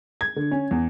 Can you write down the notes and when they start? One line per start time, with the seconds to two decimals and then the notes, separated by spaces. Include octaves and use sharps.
0.21 G#6
0.36 D3
0.51 C#4
0.71 E2